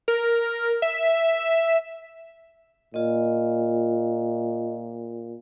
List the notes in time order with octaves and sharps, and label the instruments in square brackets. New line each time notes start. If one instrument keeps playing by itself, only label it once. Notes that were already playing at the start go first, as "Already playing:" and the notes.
[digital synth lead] A#4
E5
[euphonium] A#2 [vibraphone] F4 D#5